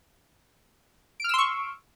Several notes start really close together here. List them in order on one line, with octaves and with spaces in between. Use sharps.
D7 F6 E6 C6 C#6